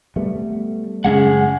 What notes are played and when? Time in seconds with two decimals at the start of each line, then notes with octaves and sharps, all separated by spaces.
0.16 G3 A3 B3
1.04 F#2 C#3 G#3 C#4 G#4 F#5